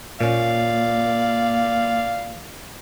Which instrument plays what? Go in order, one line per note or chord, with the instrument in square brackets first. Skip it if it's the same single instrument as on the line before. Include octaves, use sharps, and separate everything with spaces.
[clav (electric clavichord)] A#2 C#4 [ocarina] A#3 [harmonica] D5 F5